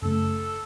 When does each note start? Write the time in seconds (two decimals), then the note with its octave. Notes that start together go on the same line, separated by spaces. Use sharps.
0.02 F#2 C#3 A3 A4